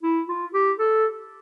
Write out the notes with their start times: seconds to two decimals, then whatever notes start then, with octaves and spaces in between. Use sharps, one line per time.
0.03 E4
0.29 F4
0.54 G4
0.79 A4